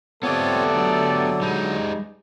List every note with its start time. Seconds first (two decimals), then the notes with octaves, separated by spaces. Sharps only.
0.23 A3 B3 C4 F4 G4 A4 C#5 D5
0.73 D3 F#3
1.42 G3 G#3 D#4